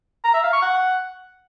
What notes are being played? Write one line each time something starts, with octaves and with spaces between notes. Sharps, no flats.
A#5
E5
F5
C#6
F#5